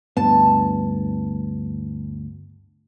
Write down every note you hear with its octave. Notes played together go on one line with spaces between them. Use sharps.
D2 G2 B3 A5